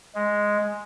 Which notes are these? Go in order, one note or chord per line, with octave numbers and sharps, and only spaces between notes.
G#3